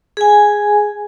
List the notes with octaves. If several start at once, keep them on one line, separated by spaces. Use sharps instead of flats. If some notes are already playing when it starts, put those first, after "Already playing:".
G#4 G#5